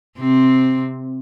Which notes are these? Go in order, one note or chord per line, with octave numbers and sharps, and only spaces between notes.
C3 C4